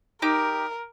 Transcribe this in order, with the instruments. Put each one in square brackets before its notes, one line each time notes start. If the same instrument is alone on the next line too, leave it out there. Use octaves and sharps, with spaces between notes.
[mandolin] D#4 G4 D6 [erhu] A#4